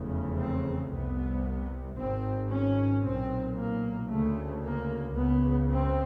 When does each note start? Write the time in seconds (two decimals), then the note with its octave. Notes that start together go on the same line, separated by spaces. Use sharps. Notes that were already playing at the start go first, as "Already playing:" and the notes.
Already playing: F1 E2 C#3
0.37 C4
0.90 C2 C3 B3
1.96 G#1 G#2 C4
2.49 C#4
3.03 B1 A#2 C4
3.57 A#3
4.09 D2 C#3 A3
4.62 A#3
5.16 C#2 C#3 B3
5.70 C4